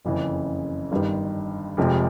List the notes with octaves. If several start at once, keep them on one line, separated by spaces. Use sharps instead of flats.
F#1 F2 C#3 E3
G1 G2 D#3
F1 F2 C3 F3 G#3